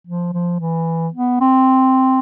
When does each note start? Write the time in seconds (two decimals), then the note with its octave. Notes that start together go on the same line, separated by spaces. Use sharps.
0.07 F3
0.33 F3
0.60 E3
1.14 B3
1.41 C4